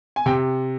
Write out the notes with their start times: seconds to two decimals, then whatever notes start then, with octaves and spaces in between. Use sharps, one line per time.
0.16 G#5
0.26 C3 G5